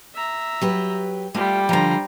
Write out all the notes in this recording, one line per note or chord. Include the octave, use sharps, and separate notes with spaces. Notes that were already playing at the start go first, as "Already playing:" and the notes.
E5 A#5
F#3 G4 B4
G3 A3 F4 G4
D3 F3 C5 A#5